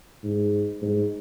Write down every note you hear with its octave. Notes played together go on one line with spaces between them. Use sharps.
G#2
G#2